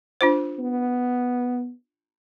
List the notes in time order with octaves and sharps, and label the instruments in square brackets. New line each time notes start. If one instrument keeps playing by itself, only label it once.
[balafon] D4 F4 C5
[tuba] B3